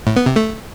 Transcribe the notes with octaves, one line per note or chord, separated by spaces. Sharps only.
A2
B3
C3
A3